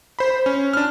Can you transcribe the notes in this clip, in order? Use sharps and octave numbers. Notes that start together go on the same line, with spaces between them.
C5 B5
C#4
D4 F6